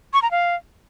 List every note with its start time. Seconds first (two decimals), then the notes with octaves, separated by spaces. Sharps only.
0.13 C#6
0.22 A#5
0.31 F5